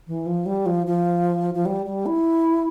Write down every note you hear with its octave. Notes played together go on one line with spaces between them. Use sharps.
E3
F3
G3
F3
F3
F3
G3
G3
E4